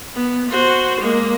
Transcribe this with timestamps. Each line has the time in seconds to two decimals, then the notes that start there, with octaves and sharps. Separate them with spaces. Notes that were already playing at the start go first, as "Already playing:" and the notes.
0.15 B3
0.50 F#4 C5
1.01 G#3 A#3